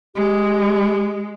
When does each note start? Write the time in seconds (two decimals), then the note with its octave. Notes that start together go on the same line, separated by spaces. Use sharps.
0.15 G#3 G4